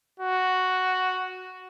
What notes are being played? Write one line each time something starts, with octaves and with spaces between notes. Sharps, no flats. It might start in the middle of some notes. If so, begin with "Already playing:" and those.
F#4